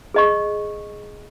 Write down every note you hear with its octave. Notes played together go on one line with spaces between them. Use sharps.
G#4 D#5 C#6